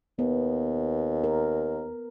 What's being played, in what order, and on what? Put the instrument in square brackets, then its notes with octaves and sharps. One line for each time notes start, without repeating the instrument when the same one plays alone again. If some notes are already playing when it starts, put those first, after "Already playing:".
[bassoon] D#2 [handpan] B3
[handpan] A#4